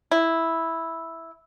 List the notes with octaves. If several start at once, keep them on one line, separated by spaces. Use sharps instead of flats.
E4